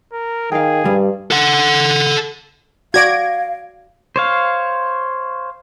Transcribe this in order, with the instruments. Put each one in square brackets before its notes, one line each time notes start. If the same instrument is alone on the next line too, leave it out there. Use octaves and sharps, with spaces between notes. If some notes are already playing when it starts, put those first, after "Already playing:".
[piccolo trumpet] A#4
[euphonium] D#3 [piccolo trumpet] G#4 [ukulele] F5 G5
[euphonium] G2 [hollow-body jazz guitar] G3
[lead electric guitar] A4 F#5
[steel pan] F#4 D5 [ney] F5 [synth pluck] G#6 A#6 D7
[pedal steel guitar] C5 C#5 F5